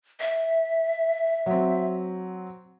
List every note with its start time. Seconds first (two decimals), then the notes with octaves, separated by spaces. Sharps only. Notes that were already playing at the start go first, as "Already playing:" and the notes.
0.20 E5
1.46 F#3 C4